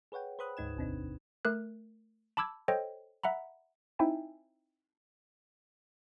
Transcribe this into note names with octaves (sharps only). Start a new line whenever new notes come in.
G#4 B4 C#5 F#5 G5
B4 C5 B5 D#6 F#6
D2 G#2 D#4 G#6 E7
A1 E2 C3 C4 D4 D#4
A3 A#4 F#6
A5 B5 D6 E6 G#6
A4 C5 C#5 D#5 G5
E5 F#5 A#5 B5
C4 D#4 E4 E5 G5 G#5